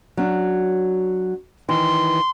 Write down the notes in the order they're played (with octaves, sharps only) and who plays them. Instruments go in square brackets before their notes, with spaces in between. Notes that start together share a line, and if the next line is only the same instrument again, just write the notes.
[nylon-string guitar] F#3 C#4 D4
[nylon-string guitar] D#3 E3 [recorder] C6